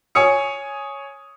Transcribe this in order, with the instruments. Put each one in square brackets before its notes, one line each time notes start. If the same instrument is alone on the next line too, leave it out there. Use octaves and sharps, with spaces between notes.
[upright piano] C#5 G#5 D#6 C#7